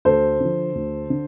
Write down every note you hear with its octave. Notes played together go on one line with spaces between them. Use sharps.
D2 A4 C5
D3 F3
D2
D3